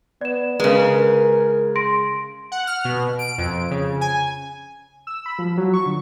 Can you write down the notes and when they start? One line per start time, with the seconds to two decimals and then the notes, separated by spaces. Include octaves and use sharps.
0.21 B3 D5 E7
0.60 C#3 G#3 A#4 B4
1.76 C6 A#6 D7
2.52 F#5
2.67 F6
2.85 B2
3.19 D7
3.38 F2
3.71 C#3
4.01 G#5
5.07 E6
5.26 B5
5.39 F3
5.58 F#3
5.73 C#6
5.86 D3